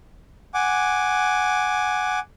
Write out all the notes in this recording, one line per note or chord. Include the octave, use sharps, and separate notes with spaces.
F#5 G#5 D6